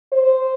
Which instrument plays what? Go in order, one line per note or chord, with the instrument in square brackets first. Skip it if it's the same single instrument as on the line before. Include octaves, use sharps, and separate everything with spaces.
[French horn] C5